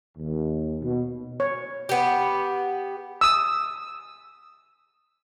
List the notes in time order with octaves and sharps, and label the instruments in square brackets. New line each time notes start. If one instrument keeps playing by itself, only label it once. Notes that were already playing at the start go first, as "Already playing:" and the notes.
[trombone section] D#2
B2
[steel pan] C#5
[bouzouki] B3 G4
[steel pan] D#6 E6